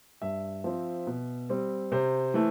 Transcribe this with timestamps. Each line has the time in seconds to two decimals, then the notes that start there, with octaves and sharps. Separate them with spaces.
0.22 G2 E5
0.64 F3 C4
1.07 B2
1.49 G3 C4
1.92 C3 C5
2.34 E3 A3